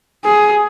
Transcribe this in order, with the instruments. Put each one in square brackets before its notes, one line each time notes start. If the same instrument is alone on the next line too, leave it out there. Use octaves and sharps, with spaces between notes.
[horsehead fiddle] G#4